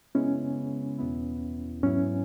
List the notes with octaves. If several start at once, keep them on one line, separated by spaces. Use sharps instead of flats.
C#3 G#3 B3 C#4 E4
E2 B2 B3 E4
G#2 F#3 B3 C#4 E4